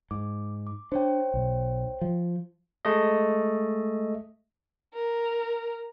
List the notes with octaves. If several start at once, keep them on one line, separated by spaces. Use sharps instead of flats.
G#2 D6
D6
D4 C5 C#5 G5
B1
F3
G#3 A3 D#5
A#4